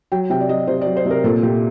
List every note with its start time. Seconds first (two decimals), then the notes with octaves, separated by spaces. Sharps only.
0.12 F#3 G5
0.30 C3 G5
0.40 D5
0.49 F#3 D#5
0.67 C3 C5
0.81 D5
0.86 F#3
0.97 C5
1.06 C3
1.11 A#4
1.24 A#2 A4
1.43 A#2 G4